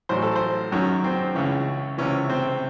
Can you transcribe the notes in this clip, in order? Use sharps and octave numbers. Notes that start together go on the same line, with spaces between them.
A1 A2 F#3 C5
A4
C5
F#2 D#3 F#3 C#4
C4
C#2 C#3 E3 C#4
C#2 C3 E3 C#4
C4